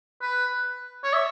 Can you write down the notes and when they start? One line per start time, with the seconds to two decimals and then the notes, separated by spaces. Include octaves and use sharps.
0.22 B4
1.04 C#5
1.13 E5